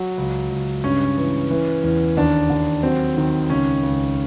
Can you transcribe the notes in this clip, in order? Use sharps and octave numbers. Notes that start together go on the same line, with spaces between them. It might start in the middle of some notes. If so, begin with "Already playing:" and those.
Already playing: F#3
C#2
C#2
G2 C#4
E3
E3
E2
D#2 D4
D#2
F#3 C4
D#3
C#2 C#4
C#2